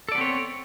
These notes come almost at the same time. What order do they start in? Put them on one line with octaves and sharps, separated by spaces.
A4 D5 B3 C4 C#5